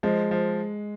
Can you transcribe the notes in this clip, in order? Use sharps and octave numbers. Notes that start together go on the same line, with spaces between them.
F3 G#3
F3